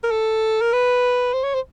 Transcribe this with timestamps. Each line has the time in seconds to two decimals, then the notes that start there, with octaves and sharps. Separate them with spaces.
0.04 A#4
0.11 A4
0.61 A#4
0.73 B4
1.34 C5
1.44 C#5
1.54 C5